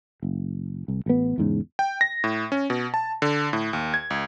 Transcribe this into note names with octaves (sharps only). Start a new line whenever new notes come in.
F#1
C2
A1 B3
E2 G#2 C#3
G5
A#6
A2
C#4
B2
A5
D3
A2
D#2
G#6
C#2